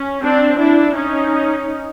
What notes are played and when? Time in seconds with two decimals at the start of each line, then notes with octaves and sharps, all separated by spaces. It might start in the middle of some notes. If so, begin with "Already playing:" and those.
Already playing: C#4
0.23 C4 D4
0.59 D4 E4
0.95 C#4 D#4